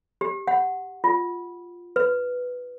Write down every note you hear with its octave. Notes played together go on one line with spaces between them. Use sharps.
G4
F#5
F4
B4